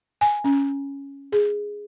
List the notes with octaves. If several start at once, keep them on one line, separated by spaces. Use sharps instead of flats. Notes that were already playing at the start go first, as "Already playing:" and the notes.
G#5
C#4
G#4